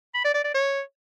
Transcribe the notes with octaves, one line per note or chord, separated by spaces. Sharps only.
B5
D5
D5
D5
C#5